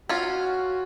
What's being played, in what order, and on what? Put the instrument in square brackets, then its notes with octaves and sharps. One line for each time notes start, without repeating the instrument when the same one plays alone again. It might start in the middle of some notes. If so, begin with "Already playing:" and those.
[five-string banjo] C#4 F4 [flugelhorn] F#4